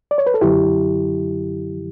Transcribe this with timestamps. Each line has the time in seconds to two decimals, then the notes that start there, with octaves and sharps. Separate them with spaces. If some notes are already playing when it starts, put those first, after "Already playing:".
0.11 D5
0.18 C#5
0.27 B4
0.34 A4
0.41 F#2 D3 F#3 E4 G4